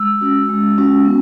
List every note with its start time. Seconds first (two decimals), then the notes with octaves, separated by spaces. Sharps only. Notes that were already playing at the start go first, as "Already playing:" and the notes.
Already playing: G#3 E6
0.21 C#4 F#4
0.49 G#3
0.78 C#4 F#4
1.05 B3